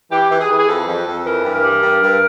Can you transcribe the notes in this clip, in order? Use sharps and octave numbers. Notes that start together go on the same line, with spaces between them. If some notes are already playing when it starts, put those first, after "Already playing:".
E3 G4
E3
G#4
E3
G#4
F2 A4
F2
F2
E3 A#4
G2
A#4
G3
G2
G2